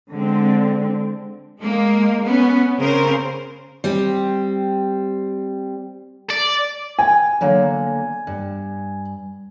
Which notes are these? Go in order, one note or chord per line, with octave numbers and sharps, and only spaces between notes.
D3 G#3 C4
G#3 A#3
B3 C#4
C#3 C4 C#4 A#4 C5
G3 C4
D5
G5 G#5
D3 F#3 A#3
G2